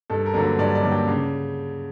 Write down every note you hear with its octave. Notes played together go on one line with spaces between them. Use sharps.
G2 A4
A#4
D3 F#3 A#3
B4
G2 D5
D5
D3 F#3 A#3
G5
C#3